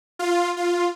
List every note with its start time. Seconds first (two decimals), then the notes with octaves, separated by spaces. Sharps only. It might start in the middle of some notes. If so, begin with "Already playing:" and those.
0.19 F4
0.57 F4